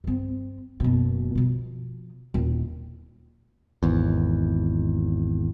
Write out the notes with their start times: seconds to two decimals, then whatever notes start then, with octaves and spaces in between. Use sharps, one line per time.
0.04 G2 C4
0.80 F#1 B2
1.35 B2 F3
2.34 D#1 E4
3.83 G#1 E2